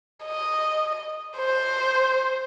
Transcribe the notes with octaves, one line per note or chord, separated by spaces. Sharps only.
D#5
C5